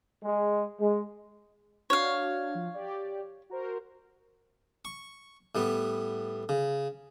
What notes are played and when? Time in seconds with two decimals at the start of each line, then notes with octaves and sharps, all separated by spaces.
0.24 G#3
0.79 G#3
1.90 D4 F#4 C#5 F5
2.55 F3
2.74 G4 D5
3.50 F#4 A#4 C5
4.85 C#6
5.55 A2 G3 B3
6.49 C#3